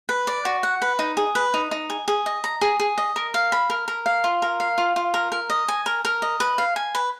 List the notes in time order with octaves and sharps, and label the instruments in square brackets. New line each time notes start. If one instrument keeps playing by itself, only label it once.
[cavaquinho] B4
D5
F#4
F#5
B4
D#4
G#4
B4
D#4
D#4
G#4
G#4
D#5
A#5
G#4
G#4
D#5
A#4
F5
B5
A#4
A#4
F5
F4
A#4
F5
F4
F4
A#4
A#4
D#5
G#5
A#4
A#4
D#5
B4
F5
G#5
B4